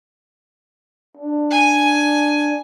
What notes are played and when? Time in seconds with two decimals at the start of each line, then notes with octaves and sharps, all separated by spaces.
1.17 D4
1.51 G#5